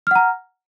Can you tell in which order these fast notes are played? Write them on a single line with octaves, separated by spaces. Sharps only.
F6 F#5 A#5